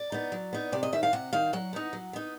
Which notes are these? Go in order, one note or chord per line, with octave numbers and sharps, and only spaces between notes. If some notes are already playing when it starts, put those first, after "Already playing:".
Already playing: D5
B3 D#4
F#3
B3 D#4
C3 D5
D#5
D#3 G3 E5
F5
C3 F#5
D#3 G3 F5
F#3 F#5
B3 D#4
F#3
B3 D#4